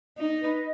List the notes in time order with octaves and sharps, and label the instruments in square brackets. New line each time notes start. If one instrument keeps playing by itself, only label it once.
[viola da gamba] D#4 [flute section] D#5
[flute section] B4